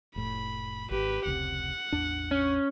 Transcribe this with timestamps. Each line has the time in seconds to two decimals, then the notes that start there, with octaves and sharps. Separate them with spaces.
0.16 F1 A2 B5
0.91 G#1 G4 B4
1.25 F1 C#2 C3 F#5
1.92 A1 E2 D4
2.31 C#4